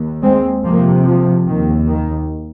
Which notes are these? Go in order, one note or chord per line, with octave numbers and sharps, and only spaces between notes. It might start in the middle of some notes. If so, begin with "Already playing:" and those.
Already playing: D#2
G#3 C4
F2 C3 F3 A#3
F3
D#2 D#3
D#3